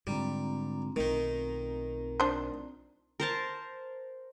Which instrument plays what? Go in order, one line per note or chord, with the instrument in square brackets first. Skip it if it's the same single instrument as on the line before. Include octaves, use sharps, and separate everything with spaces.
[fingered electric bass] G#2 D3 [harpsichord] G3 [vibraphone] C4 F4 A#5
[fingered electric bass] B1 A3 [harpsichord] D#3 D#4
[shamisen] D4 C5
[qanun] A#4 C5 A5